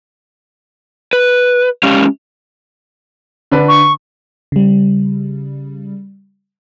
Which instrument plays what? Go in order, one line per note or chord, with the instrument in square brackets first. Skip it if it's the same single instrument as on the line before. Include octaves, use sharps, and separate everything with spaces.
[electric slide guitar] B4
G#3 C#4 G4 F5
[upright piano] D3 D4 B4
[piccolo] C#6
[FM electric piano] C#3 G3